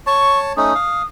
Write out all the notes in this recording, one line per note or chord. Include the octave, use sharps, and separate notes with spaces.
C#5 A5 C#6
A3 C#4 D#4 D#6
F5